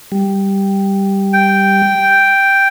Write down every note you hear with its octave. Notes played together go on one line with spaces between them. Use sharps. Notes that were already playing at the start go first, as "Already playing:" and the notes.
G3
G5